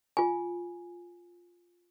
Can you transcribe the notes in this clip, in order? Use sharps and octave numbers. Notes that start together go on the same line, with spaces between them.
F4 G#5